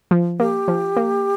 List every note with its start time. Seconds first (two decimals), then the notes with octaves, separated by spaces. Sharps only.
0.11 F3
0.40 A#3 G4
0.68 F3
0.96 A#3